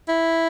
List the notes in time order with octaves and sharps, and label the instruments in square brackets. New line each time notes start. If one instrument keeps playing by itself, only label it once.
[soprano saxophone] E4